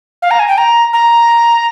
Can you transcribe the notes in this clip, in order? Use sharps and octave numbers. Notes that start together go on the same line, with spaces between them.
F5
A#5
G#5
G5
A#5
A#5